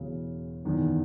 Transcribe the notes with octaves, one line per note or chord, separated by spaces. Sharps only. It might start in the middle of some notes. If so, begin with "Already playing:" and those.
Already playing: E1 E2 C#3 F#3
F#1 E2 D#3